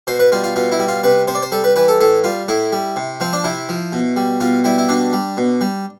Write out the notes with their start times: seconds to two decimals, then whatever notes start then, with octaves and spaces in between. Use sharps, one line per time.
0.07 B2 C5
0.20 B4
0.32 G3 F4
0.44 F4
0.56 B2 F4
0.72 E4
0.79 G3
0.88 F4
1.04 C3 B4
1.27 C3 C5
1.35 D5
1.42 C5
1.52 G3 A4
1.64 B4
1.76 E3 B4
1.88 A4
2.01 A2 A4
2.24 G3 F4
2.48 A2 E4
2.72 G3
2.96 C3
3.20 F3 C4
3.33 D4
3.44 C3 E4
3.69 F3
3.92 B2
4.16 G3
4.40 B2 F4
4.64 G3 E4
4.78 E4
4.89 B2 D4
5.13 G3
5.37 B2
5.61 G3